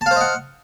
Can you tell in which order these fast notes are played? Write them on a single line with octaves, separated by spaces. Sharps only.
A5 F5 C5 D#5 F#5